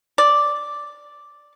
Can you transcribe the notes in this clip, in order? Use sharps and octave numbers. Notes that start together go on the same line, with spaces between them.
D5